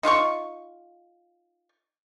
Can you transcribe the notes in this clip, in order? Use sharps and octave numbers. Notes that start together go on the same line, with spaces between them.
D#4 F4 F#5 C#6